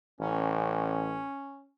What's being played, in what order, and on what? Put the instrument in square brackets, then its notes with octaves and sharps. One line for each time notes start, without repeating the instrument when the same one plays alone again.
[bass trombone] A1 [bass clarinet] C#4